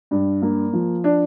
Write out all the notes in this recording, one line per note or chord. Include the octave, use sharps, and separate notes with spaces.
G2
A#3
F3
D4